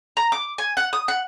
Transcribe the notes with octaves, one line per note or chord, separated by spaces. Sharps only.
A#5
D6
G#5
F#5
D#6
F#5